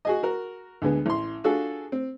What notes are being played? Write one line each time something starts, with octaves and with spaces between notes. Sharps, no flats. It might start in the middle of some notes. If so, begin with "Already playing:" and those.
F#4 G#4 D#5
F#4 A#4
D2 D3 G#3 B3
A1 C6
D4 F4 F#4 G#4 A4
C4